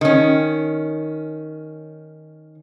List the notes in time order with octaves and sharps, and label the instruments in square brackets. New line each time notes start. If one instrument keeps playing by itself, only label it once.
[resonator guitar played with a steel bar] D#3 C#4